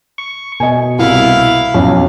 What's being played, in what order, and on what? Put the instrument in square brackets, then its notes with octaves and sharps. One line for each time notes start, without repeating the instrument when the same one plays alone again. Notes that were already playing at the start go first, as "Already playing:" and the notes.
[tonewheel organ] C#6
[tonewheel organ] B2 [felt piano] D#5 G#5
[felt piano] C2 [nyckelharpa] E4 F5
[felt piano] B1 [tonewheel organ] F2 C#4